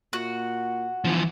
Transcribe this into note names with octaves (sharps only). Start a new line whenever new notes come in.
A#2 F#4
G1 E3 F3